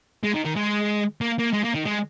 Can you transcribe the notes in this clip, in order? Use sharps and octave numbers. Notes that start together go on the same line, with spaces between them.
G#3
D#3
D#3
G#3
A#3
A#3
G#3
A#3
D#3
G#3